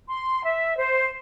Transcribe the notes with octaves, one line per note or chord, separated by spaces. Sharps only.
C6
E5
C5